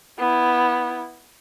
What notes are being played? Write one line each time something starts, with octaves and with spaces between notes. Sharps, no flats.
B3 E4